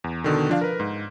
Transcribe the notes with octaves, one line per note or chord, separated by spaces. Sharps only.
E2
B2 D3 D#3
F3 D4 F5
A#4 B4
G#2